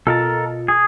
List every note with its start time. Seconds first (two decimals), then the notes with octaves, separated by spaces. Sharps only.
0.07 B2 F4 A4 A#4 D#5 A5
0.68 G#4